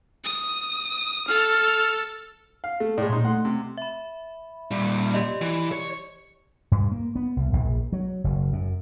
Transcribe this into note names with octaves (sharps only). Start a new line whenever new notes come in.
D#6
A4 F6
F5
A3
A2 G#3 D5
A#2 D#4 C6
A3 F#5 C6
C3
E5 B5
A#2 G3
G4 D5 D#5
E3
C#5
G2
A#3
B3
C2
A#1
F#3
F#1
F#2